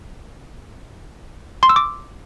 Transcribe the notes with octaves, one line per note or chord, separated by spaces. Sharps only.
C6
E6
D6